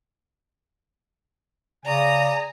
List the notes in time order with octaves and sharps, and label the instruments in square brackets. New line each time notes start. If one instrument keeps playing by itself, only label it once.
[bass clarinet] C#3 [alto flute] D5 [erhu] G#5 [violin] A#5 D#6